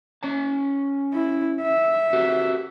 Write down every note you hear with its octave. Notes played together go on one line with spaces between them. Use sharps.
C#4 C#5 A5
E4
E5
F#4 G4 B4